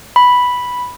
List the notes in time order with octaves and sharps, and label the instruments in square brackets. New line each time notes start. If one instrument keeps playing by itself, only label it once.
[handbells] B5